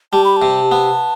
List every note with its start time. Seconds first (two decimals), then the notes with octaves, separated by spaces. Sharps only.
0.13 G3 A5
0.24 B5
0.37 A5
0.42 C3
0.71 B3